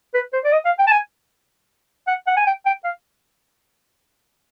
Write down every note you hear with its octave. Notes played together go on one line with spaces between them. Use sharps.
B4
C5
D5
D#5
F5
G5
A5
G#5
F#5
F#5
G#5
G5
G5
F5